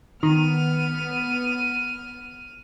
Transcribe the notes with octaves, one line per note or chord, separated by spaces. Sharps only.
D#3 B3 F6 D#7